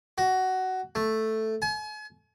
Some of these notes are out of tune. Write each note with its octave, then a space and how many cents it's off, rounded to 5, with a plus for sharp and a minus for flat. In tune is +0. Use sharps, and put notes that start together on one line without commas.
F#4 +15
A3 +0
G#5 +40